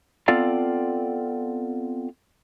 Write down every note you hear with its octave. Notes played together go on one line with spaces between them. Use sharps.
B3 C4 F4 A4 D5 F5